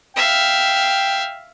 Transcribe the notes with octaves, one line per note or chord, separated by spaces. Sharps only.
E5 F5 G5